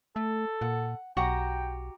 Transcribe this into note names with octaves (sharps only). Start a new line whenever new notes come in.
A3 A4
A#2 F#5
B1 F#4 G4 G5 A#5